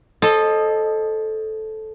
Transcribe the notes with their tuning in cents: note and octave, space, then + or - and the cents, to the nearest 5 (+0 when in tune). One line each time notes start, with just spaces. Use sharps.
A4 -10 C5 +30 D#5 -15